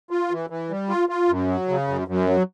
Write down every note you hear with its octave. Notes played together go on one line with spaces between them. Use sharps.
F4
E3
E3
G3
F4
F4
F#2
F#3
C#3
F#2
F#2
F#3